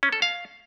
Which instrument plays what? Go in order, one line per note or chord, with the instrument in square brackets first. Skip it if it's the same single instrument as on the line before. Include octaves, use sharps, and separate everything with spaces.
[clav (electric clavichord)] C#4
A4
F5